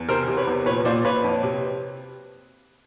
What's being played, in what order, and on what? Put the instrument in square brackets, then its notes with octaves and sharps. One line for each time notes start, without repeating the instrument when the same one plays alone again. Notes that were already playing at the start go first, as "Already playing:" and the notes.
Already playing: [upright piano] E2
C3 A#4 C5
C3
B4 C#5
E2
A#2 B4 C#5
A#2 C5 D5
A#2 B4 C#5
F2
C3